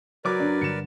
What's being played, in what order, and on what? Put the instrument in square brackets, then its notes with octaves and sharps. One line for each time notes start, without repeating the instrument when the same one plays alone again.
[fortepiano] F#3 D6 [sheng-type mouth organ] A#4 B4 D5
[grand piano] F#2 D4
[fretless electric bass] G2 D3 [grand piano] C#7 E7